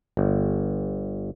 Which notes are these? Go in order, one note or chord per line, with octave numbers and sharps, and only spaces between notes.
G1